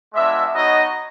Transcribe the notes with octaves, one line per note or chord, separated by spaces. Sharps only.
G#3 B3 D4 F4 D5 E5
B3 D#4 F#4 C#5 D#5